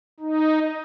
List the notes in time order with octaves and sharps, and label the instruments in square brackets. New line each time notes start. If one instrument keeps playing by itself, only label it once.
[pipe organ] D#4